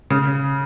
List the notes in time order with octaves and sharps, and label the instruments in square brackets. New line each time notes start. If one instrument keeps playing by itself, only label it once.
[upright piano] C#3